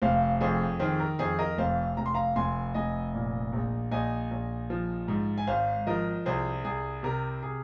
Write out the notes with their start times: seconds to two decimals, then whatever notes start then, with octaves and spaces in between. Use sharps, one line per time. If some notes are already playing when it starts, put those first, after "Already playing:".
0.02 F1 C5 F5
0.41 F2 G#4 C5
0.80 D#3 G#4 C5
1.00 A#4
1.19 F2 G#4 C5
1.39 A#4 D#5
1.58 F1 C5 F5
1.97 F1 A#5
2.06 C6
2.14 F5 A#5
2.36 F1 G#5 C6
2.74 F1 D#5 G#5
3.14 A#2
3.53 A#1
3.91 A#1 D#5 G#5
4.31 A#1
4.70 F3
5.08 G#2
5.38 G#5
5.47 G#1 C5 F5
5.87 F3 A#4 D#5
6.26 C2 G#4 C5
6.64 C2 G#4
7.03 C3 A#4
7.43 G#4